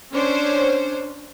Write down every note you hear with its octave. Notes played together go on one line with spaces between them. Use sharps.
C#4 D4 C5 C#5